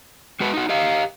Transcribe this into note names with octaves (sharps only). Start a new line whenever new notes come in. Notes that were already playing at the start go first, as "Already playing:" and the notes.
G#3 F#4 B4
D#4 F#4
G4 D#5 F5